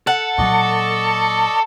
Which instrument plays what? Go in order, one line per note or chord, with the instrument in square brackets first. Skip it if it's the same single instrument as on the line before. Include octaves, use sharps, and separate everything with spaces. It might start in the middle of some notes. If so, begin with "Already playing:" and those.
[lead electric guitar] A4 [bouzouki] F#5
[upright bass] A#2 F#3 [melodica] D5 D#5 C#6